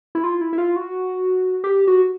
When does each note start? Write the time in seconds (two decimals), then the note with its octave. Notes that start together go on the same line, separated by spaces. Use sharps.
0.15 E4
0.24 F4
0.41 E4
0.53 E4
0.58 F4
0.76 F#4
1.64 G4
1.87 F#4